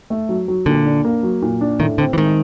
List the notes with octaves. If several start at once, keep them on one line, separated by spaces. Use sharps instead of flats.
A3
F#3
F#3
A#2 D3
D4
A#3
F#3
A#2
D4
A2 D#3
D3 C4
E3
D#3 G#3